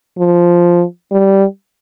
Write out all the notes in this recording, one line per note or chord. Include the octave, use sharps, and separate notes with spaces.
F3
G3